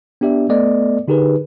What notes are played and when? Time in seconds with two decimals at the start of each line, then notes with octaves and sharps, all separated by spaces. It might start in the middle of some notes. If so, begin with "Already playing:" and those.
0.21 B3 D4 G4 D5 E5
0.49 A3 B3 A4 D5 D#5
1.08 D3 D#4 G4 G#4 A#4 B4